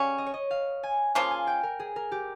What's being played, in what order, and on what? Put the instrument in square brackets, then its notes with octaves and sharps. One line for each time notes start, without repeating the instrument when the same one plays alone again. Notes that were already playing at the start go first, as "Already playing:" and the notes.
Already playing: [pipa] C#3 G3 C#4
[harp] D#5
C#5
D#5
F5
G#5
[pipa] C#3 F3 A#3 F4 [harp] G#5
[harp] G#5
G5
A#4
G#4
A#4
G4